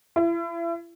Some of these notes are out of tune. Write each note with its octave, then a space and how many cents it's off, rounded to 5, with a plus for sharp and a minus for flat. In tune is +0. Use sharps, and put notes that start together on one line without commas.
E4 +35